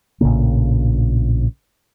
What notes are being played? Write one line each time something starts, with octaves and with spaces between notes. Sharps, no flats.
A#1 A2 C#3 A#3